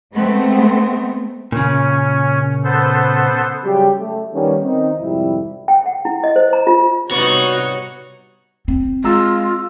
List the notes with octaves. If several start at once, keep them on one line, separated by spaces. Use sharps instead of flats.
G#3 A3 B3 C4
A#2 C#3 C#4
B3 A4 C5
C#3 F#3 G3 G4
A3
D#3 G3 B3 C#4
D#3 C4 D#4
G#1 F2 C3 G3 E4
G5
F#5
E4
D#5
C5
A#5
F4
C3 G3 B3 D#4 F#4 C#5 D5 F#5
C4
G#3 F4 A#5 E6